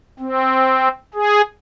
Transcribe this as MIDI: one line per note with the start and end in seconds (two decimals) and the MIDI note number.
0.20 0.88 60
1.14 1.42 68